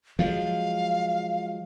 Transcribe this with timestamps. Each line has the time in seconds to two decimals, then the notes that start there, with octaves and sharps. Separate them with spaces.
0.19 F3 F#3 G#3 F5